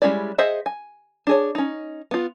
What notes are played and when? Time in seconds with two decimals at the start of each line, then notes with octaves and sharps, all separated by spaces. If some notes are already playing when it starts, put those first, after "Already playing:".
0.02 G3 G#3 C#4 E4 D5
0.38 G#4 C5 D#5 E5 F#5
0.66 G#5
1.27 D4 G#4 C#5
1.55 C#4 D#4
2.11 B3 F4